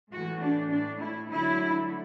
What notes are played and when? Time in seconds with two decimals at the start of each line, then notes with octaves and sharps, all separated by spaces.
0.12 A2 E3 A3 F#4
0.43 D4
0.71 A2 D4
0.76 A3
1.01 E4
1.31 D3 F#3 A3 E4